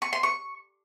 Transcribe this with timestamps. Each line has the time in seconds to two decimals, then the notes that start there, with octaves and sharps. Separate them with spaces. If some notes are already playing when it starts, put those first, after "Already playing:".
0.02 C#6
0.13 C6
0.23 C#6